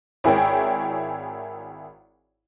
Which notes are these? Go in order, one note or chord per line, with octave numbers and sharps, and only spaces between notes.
G#1 E4 G#4 A#4 C#5 G5